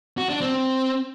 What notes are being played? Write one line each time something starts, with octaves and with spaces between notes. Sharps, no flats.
F#4
D4
C4